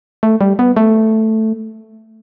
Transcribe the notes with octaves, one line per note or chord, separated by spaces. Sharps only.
A3
G3
B3
A3